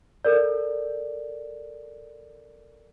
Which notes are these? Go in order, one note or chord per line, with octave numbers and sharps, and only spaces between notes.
A4 A#4 D5